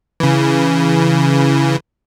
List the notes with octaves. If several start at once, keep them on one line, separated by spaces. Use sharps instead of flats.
C#3 E3